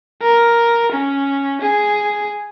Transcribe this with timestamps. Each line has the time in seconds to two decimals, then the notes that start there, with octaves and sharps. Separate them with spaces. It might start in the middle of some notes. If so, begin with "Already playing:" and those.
0.22 A#4
0.92 C#4
1.62 G#4